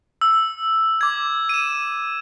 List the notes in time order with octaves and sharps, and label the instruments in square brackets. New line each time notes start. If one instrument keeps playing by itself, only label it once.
[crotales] E6
D6 G#6
D#7 E7